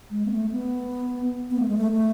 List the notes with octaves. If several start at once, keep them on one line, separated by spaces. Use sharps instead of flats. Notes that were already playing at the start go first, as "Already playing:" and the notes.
G#3
B3
A3
B3
B3
A3
G#3
A3
A3